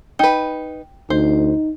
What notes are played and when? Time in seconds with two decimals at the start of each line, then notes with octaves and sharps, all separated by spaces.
0.19 D#4 B4 G5
1.10 D2 D#4 C5